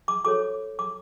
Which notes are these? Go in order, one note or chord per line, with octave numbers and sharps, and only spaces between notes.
D6
F#4 A4 C#5 D6
D6